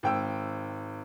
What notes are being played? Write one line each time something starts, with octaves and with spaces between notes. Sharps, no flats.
G#1 G5 E6